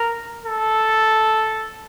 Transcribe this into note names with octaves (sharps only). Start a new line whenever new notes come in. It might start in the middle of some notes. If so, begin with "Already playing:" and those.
Already playing: A#4
A4